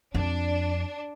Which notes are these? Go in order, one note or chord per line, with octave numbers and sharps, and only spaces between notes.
F2 D4